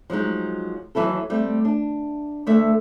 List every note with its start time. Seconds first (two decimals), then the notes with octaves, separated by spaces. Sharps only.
0.10 F3 F#3 G#3 D#4
0.95 D#2 A#2 E3 F#3 E4 A4
1.30 G3 A3 C4
1.65 D4
2.47 D2 A3 E5